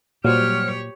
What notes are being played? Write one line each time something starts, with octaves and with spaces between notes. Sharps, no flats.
A#2 F#3 G3 G4 C5 C#5 F6